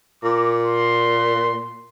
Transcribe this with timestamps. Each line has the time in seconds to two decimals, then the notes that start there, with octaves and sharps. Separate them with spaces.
0.24 A#2 D6
0.63 C6